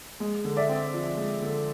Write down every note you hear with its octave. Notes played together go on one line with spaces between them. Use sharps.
G#3
D3
D5 E5
C4
F3
G#3
D3